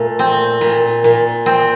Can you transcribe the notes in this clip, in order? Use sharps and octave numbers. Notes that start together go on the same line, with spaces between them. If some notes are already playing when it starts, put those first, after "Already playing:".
Already playing: A#2 A3
C4
A#2
A#2
C4